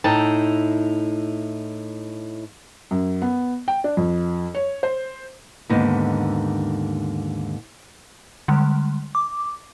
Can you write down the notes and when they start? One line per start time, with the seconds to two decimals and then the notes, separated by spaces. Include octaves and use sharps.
0.04 A2 D#4 E4 G5 A5
2.91 F#2
3.22 B3
3.68 G5
3.84 D4
3.97 F2
4.54 C#5
4.83 C5
5.70 D#2 G#2 D3 B3
8.48 D3 G3 G#3
9.15 D6